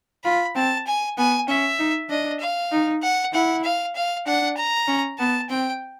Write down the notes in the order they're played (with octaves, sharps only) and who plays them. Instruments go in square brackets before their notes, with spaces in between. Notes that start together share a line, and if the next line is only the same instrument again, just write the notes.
[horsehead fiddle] F4 [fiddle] B5
[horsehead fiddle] C4 [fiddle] A5
[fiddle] G#5
[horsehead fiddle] B3 [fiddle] G#5
[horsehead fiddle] C#4 [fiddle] E5
[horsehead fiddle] D#4
[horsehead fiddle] D4 [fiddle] D#5
[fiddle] F5
[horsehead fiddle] D#4
[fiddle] F#5
[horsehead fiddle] E4 [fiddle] F#5
[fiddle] F5
F5
[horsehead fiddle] D4 [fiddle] F#5
[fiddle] A#5
[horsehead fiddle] C#4
[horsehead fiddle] B3 [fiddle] A5
[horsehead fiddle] C4 [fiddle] G5